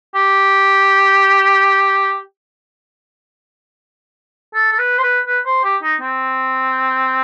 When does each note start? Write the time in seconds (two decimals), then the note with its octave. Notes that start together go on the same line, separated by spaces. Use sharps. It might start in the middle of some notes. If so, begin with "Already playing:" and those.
0.15 G4
4.54 A4
4.72 A4
4.79 B4
4.98 C5
5.03 B4
5.27 B4
5.46 C5
5.64 G4
5.83 D#4
6.01 C4